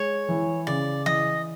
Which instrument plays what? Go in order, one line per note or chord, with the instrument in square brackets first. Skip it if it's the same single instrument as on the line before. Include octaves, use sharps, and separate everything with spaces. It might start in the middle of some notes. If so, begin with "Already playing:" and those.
Already playing: [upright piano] G#3 [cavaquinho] C#5
[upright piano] E3
[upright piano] C#3 [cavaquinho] D5
[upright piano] E3 [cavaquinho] D#5